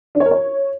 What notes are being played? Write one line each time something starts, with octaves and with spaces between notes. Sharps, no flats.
D4
C#5
A#4
C#5